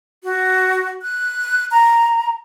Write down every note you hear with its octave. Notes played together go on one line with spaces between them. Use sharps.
F#4
F#6
A#5